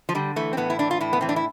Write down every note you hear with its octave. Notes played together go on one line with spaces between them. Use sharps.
F3
D3 G3
E3 A3
C4
A2 B3
E4
E3 D4
F4
A2 E4
B3
E3 C4
D4
E4